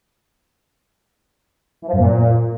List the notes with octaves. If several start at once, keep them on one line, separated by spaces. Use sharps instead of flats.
E3
F3
F#2
A#2